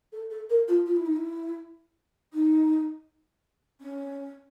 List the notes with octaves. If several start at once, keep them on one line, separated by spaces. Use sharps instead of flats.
A4
A4
A#4
F4
F4
E4
D#4
E4
D#4
C#4